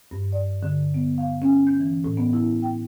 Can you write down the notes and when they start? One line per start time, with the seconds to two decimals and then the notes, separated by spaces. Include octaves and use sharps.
0.11 G2
0.32 D5
0.63 D3
0.94 B3
1.18 F5
1.42 C#4
1.67 G6
1.80 E3
2.04 A2
2.17 B3
2.33 E4
2.63 G5